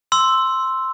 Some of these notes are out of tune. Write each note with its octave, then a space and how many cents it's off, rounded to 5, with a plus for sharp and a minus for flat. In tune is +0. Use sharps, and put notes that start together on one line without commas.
C6 +0 E6 +0